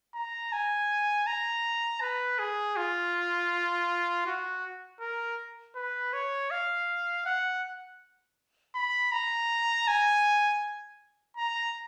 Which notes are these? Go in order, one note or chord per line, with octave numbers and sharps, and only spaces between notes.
A#5
G#5
A#5
B4
G#4
F4
F#4
A#4
B4
C#5
F5
F#5
B5
A#5
G#5
A#5